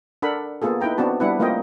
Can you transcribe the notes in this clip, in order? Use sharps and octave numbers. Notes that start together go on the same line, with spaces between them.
D4 A4 A#4 F#5 B5
A#3 B3 F4 G#4 A4
D#4 E4 B4 G5 A#5
B3 C4 D4 F#4 A5
G3 B3 D4 E4 B4 F#5
A3 A#3 C4 F4 D#5 G5